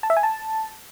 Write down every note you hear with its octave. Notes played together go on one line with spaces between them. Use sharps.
A5
E5
G#5
A5